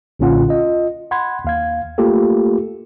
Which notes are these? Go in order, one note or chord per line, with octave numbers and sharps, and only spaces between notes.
B1 A#2 D3 C#4 F4 F#5
F4 D#5
F#5 B5 C6 G#6
D#2 F5 G#6
A3 A#3 F4 G4 A4